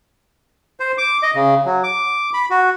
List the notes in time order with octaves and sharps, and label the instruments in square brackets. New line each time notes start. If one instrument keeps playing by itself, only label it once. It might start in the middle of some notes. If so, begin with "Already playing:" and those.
[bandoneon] C5
D6
D#5
C#3
F#3
D6
B5
F#4